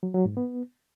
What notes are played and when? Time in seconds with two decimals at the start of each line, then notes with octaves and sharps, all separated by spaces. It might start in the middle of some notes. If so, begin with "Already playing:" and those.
0.03 F#3
0.14 F#3
0.25 G#2
0.37 B3